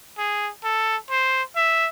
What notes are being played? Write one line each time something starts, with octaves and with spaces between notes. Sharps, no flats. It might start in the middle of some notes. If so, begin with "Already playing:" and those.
G#4
A4
C5
E5